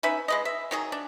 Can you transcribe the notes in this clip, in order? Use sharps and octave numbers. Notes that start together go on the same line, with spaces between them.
C#4 D#4 B4 E5
G#3 B4 D#5
E5
D#3 F#3 G#4
D4